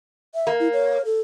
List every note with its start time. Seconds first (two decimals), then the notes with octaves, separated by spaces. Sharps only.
0.35 E5
0.47 A#3
0.60 E4
0.73 C#5
1.05 A4